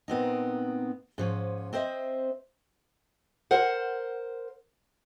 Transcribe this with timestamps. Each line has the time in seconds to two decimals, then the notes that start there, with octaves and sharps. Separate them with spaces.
0.08 A#2 B3 C4 D#4
1.18 G#2 F3 C#4
1.73 C4 C5 D#5 E5
3.51 A#4 C5 F#5